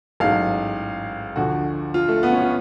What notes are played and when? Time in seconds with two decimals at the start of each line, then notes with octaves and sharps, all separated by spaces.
0.20 A1 G#2 F#3 F5
1.36 D2 D3 F3 F#4
1.94 F4
2.08 A3
2.23 B3
2.33 C#4
2.41 F4